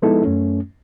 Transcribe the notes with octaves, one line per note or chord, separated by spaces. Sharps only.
F3 G#3 B3 D#4 E4 A4
F#2 A3 C#4